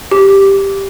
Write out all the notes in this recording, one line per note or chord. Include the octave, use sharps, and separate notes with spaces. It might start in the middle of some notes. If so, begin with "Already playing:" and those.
G4